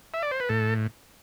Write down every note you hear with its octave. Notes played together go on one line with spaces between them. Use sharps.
E5
D5
C5
B4
A2 A4